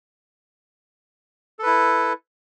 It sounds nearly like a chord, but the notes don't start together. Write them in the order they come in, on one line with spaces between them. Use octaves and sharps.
A4 B4 E4